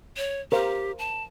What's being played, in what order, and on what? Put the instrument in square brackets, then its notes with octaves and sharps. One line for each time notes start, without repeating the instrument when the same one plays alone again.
[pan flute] C#5
[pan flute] G4 [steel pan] A#4 C5 F5
[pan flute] A5